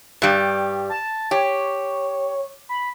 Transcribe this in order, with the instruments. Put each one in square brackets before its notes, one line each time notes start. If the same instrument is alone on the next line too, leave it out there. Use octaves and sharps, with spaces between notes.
[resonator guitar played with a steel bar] G2 G3
[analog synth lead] A5
[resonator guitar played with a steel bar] G4 [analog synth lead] C#5
[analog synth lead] B5